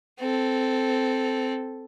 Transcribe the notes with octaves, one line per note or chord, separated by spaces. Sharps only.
C4 A4